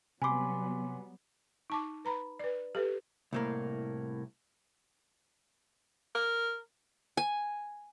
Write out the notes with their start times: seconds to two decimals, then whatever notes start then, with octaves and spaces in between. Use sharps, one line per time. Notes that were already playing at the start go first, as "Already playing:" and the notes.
0.22 C3 F#3 G3 B3 G#5 B5 C6 D6
1.70 D#4 A5 D6
2.05 B4 A#5 B5
2.39 B4 D5
2.75 G4 A4 B4
3.33 C2 A2 A#3
6.15 A#4
7.17 G#5